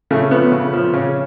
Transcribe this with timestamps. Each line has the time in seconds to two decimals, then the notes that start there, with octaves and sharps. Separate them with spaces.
0.11 C#3 A3
0.31 F3 B3
0.52 C#3
0.73 F3
0.93 C#3 C#4